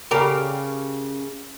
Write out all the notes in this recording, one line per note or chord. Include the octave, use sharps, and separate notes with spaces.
C#3 G4 A#4